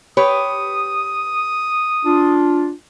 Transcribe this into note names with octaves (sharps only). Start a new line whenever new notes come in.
G4 B4 C#5 D#6
D4 F4